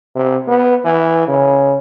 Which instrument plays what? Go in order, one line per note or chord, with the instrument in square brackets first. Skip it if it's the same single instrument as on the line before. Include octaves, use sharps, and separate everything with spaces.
[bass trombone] C3
B3
E3
C#3